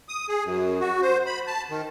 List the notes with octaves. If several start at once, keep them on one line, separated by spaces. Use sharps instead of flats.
D#6
G#4
F#2
F#4
C5
B5
A5
D#3